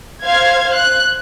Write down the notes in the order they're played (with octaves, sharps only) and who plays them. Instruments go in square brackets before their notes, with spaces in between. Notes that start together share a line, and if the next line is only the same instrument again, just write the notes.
[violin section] C5 F5 G#6
F#6